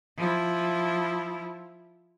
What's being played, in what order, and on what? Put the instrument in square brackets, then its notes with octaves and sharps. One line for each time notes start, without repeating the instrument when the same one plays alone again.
[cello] F3 E4